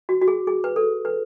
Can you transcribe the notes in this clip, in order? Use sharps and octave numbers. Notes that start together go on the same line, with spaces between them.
F#4
F#4
G#4
G#4
B4
A4
B4